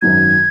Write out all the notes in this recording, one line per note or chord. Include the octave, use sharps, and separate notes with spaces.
G#1 F#2 D#3 F#3 G#6